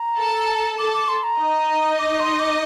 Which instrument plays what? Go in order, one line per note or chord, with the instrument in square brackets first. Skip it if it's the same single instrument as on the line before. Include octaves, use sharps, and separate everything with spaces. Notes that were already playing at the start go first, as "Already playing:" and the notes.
Already playing: [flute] A#5
[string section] A4 A5
[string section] A4 A5 [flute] D6
[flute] D6
C6
A#5
[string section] D#4 D#5
[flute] D6
C6
D6